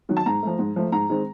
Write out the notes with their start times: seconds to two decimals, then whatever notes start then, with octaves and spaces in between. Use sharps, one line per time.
0.09 D#3 F#3
0.17 A5
0.26 G#2 A#5
0.43 F3 A3
0.59 G#2
0.76 F3 A3
0.92 G#2 A#5
1.10 D#3 G#3 C4